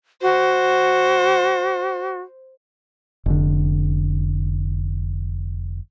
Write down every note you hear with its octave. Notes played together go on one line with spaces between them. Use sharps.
F#4 C5
F1 D3